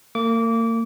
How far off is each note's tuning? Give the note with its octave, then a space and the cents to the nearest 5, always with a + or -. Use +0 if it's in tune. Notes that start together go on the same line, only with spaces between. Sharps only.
A#3 -40 D6 -25